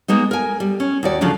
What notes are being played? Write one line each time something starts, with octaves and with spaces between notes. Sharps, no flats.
G#3 A#3 B3 D#4
A#4 G#5
G3
C#4
D#2 F#4 D5
D2 C#3 F3 F#3 D4